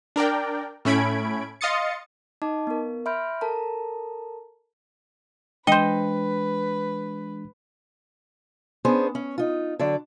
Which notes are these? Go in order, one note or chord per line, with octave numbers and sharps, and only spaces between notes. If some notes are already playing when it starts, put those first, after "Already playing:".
D4 A#4 D5 G5
A2 A3 C#4 B5 G#6 D7
D#5 F5 C6 D#6 A6 C#7
D#4 D#5 A5 D6
B3 A#4
E5 B5 C6 F6 G6 D7
A4 A#4 A5 A#5
E3 G#3 D4 B4 C5 D#5 G5
B3 C#4 D4 G#4 C5
C#4
D#4 F4
D3 F#3 D5